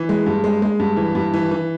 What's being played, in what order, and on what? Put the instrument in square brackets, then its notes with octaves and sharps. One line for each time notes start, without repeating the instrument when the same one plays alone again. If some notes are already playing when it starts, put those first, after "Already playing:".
Already playing: [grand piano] E3
G#3
G2
G#3
G#3
G2
E3
G2
E3
E3